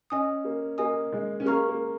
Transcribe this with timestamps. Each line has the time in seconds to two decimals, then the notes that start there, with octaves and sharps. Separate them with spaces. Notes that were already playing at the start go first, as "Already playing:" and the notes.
0.10 C#4 D#5 G#5 D#6
0.45 A#3
0.78 A#3 D#5 G#5 D#6
1.13 G#3
1.40 C#4
1.45 A#3 G#4 F5 A#5 C#6 F6
1.69 A#3